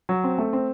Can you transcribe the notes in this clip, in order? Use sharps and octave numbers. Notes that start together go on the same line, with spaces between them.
F#3
C4
A3
C4